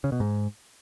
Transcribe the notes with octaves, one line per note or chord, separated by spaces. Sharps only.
C#3
B2
G#2